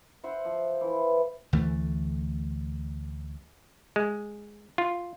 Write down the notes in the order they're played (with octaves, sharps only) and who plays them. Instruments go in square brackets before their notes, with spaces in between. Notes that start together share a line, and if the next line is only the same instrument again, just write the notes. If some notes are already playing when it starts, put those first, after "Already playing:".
[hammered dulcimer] C5 E5 F#5
F3
E3
[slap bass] D2 E3 A3
[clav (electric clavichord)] G#3
F4